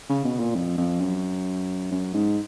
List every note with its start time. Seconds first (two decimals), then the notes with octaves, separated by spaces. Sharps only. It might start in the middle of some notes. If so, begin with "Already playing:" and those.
0.09 C#3
0.24 B2
0.39 A#2
0.55 F2
0.77 F2
1.00 F#2
1.91 F#2
2.14 G#2